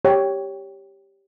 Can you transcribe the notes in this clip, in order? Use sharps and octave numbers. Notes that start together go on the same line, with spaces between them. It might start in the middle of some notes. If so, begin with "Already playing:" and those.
G4 C#5 G5